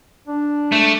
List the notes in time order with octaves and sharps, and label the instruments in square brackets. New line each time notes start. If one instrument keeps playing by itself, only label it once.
[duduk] D4
[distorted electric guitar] A3